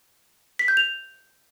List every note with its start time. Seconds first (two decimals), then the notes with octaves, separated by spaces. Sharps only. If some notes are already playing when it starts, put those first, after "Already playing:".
0.59 B6
0.68 G6
0.77 F7